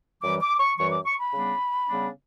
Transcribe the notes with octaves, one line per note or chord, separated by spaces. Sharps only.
F#2 E3 G3 D6
D6
C#6
F#2 E3 G3 C#6
D6
C#6
B5
C#3 G3 B3 D4
C#3 G3 B3 D4